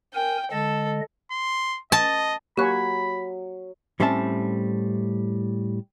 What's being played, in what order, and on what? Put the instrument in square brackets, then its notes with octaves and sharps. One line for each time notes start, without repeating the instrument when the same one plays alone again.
[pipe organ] A#4 G#5 [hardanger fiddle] G5
[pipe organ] D3 G#3 D#5 [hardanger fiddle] A4
[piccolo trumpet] C6
[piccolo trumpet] D#5 [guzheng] A5
[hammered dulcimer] F#3 [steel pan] A#3 C#5 G#5 [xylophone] G4 F#6 [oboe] B5
[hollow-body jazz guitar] A2 G3 C4 C#4 E5 A5